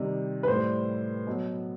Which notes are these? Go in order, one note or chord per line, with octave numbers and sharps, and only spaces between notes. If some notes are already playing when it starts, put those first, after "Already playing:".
Already playing: C3 D#3 G3
B4
A2 G3 C5
B2 F#3